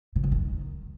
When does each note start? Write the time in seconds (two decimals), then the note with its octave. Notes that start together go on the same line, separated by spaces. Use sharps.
0.16 C3
0.24 C#3
0.32 D#3